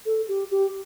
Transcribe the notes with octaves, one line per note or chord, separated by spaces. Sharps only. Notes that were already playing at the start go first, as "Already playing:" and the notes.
A4
G4
G4